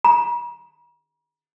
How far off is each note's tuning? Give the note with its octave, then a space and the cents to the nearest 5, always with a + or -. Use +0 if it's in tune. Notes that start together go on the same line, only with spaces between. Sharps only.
A#5 +45